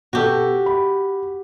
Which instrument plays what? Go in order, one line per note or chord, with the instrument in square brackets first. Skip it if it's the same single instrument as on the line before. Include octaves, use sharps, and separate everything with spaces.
[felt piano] B2 A4 [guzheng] F#4 G4
[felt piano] B5